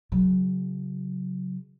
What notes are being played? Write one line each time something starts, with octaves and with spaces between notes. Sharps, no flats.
C#3 F#3